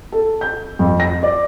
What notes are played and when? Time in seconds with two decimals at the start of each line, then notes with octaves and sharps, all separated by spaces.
0.12 A4
0.41 G6
0.79 F2
1.00 A#6
1.23 D5